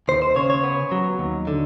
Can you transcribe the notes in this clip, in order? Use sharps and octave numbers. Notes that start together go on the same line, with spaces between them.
D#2 C5
C5
C#3 C#5
C#5
B3
F#3
D#2
D3